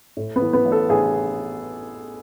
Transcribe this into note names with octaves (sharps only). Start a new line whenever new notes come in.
A2
B3
E3
B3
A1
A4
A1 G#4